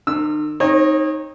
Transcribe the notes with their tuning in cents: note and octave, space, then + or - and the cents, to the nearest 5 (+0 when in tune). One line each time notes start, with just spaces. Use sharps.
D#3 -45 E6 +0
C4 +20 D#4 +0 C#5 -30